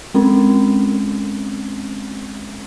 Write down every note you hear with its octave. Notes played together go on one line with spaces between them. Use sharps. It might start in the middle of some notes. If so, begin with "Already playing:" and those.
G#3 C4 C#4